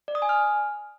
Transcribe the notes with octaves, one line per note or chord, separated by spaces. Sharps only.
D5
D#6
G#5
F6